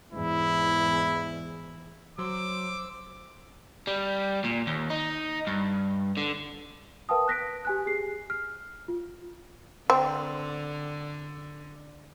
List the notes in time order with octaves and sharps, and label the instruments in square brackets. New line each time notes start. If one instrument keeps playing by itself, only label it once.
[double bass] E2 G#2 [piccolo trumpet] E4
[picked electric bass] F#3 [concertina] C5 E6 [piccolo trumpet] D6
[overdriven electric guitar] G3
A#2
D#2
D#4
G2
D3
[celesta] A#4 B4 F5 G5 A5 D#6
F#6 A#6 B6 D7
G4 G#5 F#6
G4 G#4 C7
F6
F4
[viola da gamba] D3 [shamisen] C4